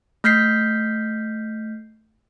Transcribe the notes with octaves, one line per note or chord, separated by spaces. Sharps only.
A3 F6 G6 B6 C7